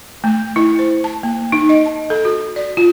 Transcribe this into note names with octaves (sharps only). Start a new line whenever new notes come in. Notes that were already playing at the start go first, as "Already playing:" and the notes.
A3
E4
C5
A5
A#3
D#4
D#5
A5
A4
F#4
D5
F4